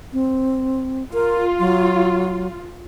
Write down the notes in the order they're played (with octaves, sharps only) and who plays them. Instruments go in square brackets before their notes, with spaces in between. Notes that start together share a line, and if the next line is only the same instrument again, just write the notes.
[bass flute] C4
[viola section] F4 [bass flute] A#4
[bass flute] F#3